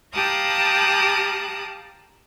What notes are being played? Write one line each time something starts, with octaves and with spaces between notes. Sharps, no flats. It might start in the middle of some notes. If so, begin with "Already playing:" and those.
G4 F5 A5 A#5 D#6 F#6